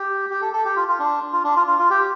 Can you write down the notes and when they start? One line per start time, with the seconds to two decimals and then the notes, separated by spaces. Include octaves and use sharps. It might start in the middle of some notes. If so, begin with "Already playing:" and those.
Already playing: G4
0.30 G4
0.42 A4
0.53 A4
0.65 G4
0.76 F4
0.88 F4
0.99 D4
1.33 F4
1.44 D4
1.56 F4
1.67 F4
1.79 F4
1.90 G4